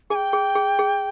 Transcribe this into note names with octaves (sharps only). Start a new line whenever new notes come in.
G#4 G#5
G5
G#4
G#4
G#4